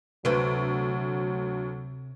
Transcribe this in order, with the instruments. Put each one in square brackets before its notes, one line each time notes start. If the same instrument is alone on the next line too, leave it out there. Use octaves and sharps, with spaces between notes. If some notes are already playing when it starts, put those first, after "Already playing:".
[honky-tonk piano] D2 D7 [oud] C3 B4 C5 [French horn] F#3